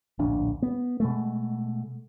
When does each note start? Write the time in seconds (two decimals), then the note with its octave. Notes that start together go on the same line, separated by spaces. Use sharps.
0.19 D1 A#1 D4
0.62 B3
1.00 B2 G#3 A3